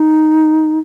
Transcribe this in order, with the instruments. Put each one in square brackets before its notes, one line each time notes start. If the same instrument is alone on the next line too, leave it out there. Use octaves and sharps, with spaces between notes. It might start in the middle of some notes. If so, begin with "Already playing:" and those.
Already playing: [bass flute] D#4